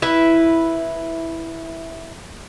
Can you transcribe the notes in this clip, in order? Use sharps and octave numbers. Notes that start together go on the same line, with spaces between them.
E4 B4 E5